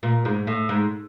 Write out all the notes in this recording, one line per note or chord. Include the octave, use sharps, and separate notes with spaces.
A#2
G#2
A2
G#2